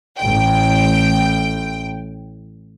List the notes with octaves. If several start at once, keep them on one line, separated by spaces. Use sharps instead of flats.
A1 G5